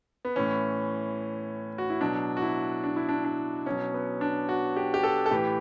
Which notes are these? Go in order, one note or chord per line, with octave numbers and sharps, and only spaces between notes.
B3
A2 E3 C#4
F#4
E4
B2 F#3 D4
F#4
E4
D4
E4
D4
D4
B2 F#3 C#4
B3
D4
F#4
G4
G4
A4
A4
A2 E3 G4